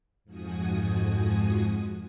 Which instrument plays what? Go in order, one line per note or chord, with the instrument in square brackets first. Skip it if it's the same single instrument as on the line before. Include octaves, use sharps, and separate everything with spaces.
[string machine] F2 G#2 F3 F#4 G#5 D#6